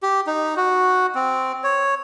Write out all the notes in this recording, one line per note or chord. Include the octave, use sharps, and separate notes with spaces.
G4
D#4
F#4
C4
C#5